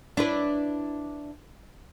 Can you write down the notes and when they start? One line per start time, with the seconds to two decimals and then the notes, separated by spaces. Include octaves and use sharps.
0.17 D4 E4 B4